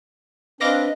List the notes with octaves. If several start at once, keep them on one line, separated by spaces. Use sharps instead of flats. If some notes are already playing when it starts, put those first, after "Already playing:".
C4 D4 B4 D#5 F5 D6 A#6